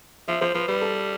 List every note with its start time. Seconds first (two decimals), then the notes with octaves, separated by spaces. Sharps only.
0.28 F3 E5
0.41 F3 C5
0.54 F3 B4
0.68 G3 B4
0.82 A4